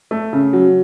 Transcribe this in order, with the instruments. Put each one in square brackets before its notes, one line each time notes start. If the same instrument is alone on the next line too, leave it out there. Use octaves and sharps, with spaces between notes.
[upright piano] A3
C#3
F#3